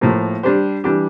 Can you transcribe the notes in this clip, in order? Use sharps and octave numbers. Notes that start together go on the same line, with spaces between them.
A2 F3 A#3
G3 D4 G4 C5
E3 G3 D4 G4